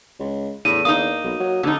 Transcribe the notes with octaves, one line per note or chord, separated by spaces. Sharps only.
C#2
E2 A2 D#7
A#3 D#4 D#6
B1
F#3
F1 D3 D#4